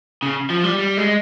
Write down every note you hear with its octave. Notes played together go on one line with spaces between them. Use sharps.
C#3
F3
G3
G3
G#3